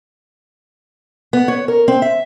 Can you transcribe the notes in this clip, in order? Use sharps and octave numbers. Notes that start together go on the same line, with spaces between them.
B3
C#5
A#4
C4
E5